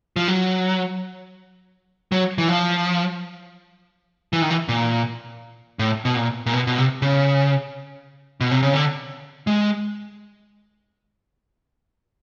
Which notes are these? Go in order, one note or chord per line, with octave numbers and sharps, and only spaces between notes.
F3
F#3
F#3
E3
F3
E3
D#3
E3
A#2
A2
B2
A#2
A#2
B2
B2
C3
C#3
B2
C3
C#3
D3
G#3